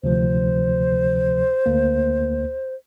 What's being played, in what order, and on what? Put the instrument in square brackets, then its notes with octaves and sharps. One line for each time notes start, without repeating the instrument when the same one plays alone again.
[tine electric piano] D2 C3 F3 [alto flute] C5
[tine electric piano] D2 A#3